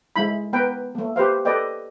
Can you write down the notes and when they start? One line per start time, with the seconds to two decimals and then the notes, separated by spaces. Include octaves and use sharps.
0.16 G#3 A3 E4 B5
0.53 B3 A#4 B4 G5
0.95 A3 A#3
1.16 G4 B4 C5 F5
1.45 A4 B4 D5 D#5 G5